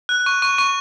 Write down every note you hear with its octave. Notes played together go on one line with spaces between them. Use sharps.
F#6
C#6
C#6
C#6